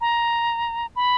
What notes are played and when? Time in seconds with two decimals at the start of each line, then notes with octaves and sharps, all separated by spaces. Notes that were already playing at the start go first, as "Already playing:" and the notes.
0.01 A#5
0.96 B5